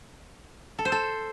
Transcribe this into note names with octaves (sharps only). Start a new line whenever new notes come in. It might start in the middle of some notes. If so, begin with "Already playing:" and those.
A4
C5
A4